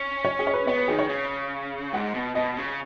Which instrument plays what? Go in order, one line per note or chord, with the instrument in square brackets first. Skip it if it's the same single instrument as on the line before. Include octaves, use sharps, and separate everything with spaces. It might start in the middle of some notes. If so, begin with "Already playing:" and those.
Already playing: [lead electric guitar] C#4
[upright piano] C#5
G#4
C#5
B4
[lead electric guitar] B3 [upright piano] C#5
[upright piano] B4
[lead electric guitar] D#3 [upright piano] G#4
[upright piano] C#5
[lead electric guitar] C#3
[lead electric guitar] G#2 [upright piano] F#5
[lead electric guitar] B2
[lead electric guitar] B2 [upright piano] D#5
[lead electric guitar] C#3